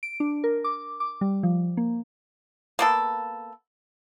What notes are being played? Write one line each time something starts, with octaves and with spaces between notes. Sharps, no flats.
D7
D4
A#4
D6
D6
G3
F3
A#3
A#3 B3 A4